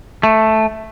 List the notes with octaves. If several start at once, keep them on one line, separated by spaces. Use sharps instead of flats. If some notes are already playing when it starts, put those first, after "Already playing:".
A3